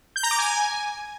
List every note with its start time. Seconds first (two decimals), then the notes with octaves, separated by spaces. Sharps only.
0.16 G6
0.23 A#5
0.31 D6
0.38 G#5